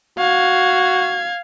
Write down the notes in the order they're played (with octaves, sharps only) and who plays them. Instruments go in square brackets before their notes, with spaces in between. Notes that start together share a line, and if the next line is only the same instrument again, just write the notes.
[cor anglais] F#4 [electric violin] F5 G#6